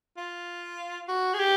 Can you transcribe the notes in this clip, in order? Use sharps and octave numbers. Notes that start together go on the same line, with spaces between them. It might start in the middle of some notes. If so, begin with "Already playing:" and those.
F4
F#4
G#4
G4